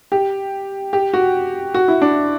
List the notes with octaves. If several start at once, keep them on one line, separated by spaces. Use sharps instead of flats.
G4
G4
F#4
F#4
E4
D4